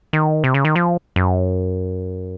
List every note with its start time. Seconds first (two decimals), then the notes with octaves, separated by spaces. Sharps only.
0.13 D#3
0.44 C3
0.54 C#3
0.65 D#3
0.76 F3
1.16 F#2